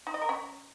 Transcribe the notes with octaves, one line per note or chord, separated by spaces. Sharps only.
D#4
D#5
A#4
C#4